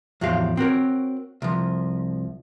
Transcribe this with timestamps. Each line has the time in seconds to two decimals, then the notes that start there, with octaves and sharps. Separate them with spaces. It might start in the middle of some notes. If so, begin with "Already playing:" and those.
0.21 E2 A2 F3 F#4 G4 F5
0.57 C4 F#4 A#4 C#5
1.42 C2 F3